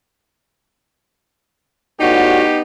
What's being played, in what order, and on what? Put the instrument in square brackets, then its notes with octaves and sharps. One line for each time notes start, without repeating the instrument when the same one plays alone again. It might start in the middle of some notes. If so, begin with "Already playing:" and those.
[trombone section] A2 G3 F#4 [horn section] B3 D#4 G4